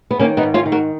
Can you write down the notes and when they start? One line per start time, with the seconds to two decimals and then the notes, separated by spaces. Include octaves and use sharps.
0.11 B3
0.19 D#3 A#3 C#4
0.37 B3 D#4
0.43 G#2
0.54 C#4 F4
0.66 D#3
0.72 F#4 A#4